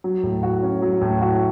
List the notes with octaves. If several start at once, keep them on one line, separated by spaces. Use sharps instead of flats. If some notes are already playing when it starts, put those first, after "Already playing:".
F#3
A2
F#4
C#4
F#3
A2
F#4